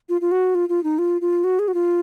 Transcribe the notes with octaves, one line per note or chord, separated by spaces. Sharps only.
F4
F4
F#4
F4
F4
D#4
F4
F4
F#4
G#4
F#4
F4